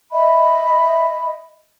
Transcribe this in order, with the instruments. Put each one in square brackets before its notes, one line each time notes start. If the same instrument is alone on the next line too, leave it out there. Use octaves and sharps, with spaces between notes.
[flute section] D#5 E5 B5